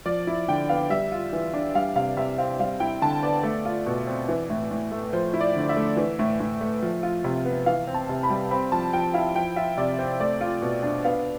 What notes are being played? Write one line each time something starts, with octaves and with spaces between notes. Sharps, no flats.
F3 D5
E4
D3 G5
B3 F5
G3 E5
F4
E3
D4
G3 F5
C3 F5
C3 E5
C4 F5
G3 F5
E4 G5
D3 A5
B3 D5
A3
F4
B2
C4
E3
A2
A2
A3
F3 C5
E4
D5
D3
E5
A3
E3
A2
A2
A3
F3
F4
C3
B3
E3 F5
C4
A5
C3
B5
G3
C4 B5
F3 A5
F3 G5
E4 F5
F3 G5
F4 E5
C3 D5
C4 C5
A3 D5
F4
B2
D4
B3 F5